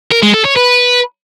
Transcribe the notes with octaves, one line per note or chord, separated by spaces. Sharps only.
A#4
G#3
A4
C#5
B4